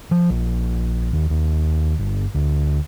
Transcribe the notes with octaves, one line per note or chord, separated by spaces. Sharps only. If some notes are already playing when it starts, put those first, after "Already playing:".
F3
A#1
D#2
D#2
G1
D2